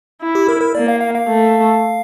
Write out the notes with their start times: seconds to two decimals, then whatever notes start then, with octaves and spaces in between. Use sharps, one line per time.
0.22 E4
0.35 G4
0.48 A#4
0.61 A#4
0.75 A#3 D5
0.88 F5
1.01 F5
1.15 F5
1.27 A3